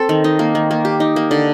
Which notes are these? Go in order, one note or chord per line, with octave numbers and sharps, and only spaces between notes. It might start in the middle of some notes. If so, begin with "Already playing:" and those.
Already playing: C4 A4
D#3
D#4
A#3
D#3
A#3
G4
D#4
A#3
D3